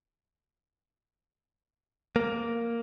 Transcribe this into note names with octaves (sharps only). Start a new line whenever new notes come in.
A#3